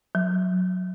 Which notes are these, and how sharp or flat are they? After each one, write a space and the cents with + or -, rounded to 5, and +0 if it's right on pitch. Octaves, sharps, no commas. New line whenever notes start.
F#3 -15